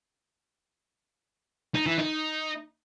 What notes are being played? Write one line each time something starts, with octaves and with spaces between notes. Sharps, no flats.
D#4
E3
D#4